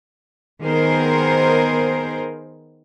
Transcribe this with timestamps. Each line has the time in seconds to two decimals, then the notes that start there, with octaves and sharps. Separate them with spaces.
0.61 D#3 B3 G#4 A#4 C5